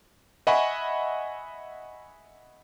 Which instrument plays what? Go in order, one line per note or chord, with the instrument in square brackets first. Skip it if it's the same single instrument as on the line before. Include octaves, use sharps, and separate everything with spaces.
[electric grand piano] D#5 E5 F#5 G#5 B5 C#6